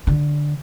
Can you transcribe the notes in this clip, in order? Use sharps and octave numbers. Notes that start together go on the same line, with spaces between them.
D3